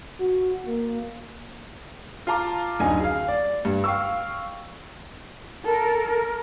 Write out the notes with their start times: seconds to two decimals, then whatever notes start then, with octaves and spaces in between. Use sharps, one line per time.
0.20 F#4
0.66 A#3
2.27 F4 F5 A5 A#5 D6
2.79 D1 F#2 D3 D#4 G#5
3.00 G#4 F5
3.28 D5
3.65 G2
3.84 F5 G5 C#6 E6
5.65 A4 A#4